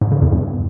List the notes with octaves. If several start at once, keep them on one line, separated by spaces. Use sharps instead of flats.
G#2
C#3
E2
G2